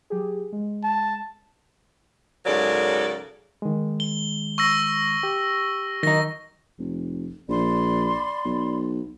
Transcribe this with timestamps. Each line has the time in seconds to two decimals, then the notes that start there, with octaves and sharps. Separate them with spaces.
0.10 F#3 G4 G#4
0.52 G#3
0.84 A5
2.46 G#2 C#3 F#3 A4 A#4 D5
3.62 D#3 G#3
4.00 G7
4.58 C#6 E6 A#6
5.23 G4
6.03 D#3 F#3 D#4 A#6
6.79 F1
7.48 A#1 D5 B5 C6
8.45 B1